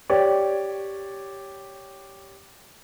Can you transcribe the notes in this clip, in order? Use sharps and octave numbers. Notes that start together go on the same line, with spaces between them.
G4 C#5 D5